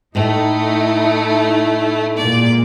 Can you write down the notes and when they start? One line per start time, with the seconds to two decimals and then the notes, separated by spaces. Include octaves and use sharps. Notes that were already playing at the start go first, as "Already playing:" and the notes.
0.15 A2 A3 D#4 E4 D#5
2.17 A#2 G#3 A#3 D5